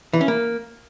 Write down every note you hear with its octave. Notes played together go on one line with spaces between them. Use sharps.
E3
C#4
A#3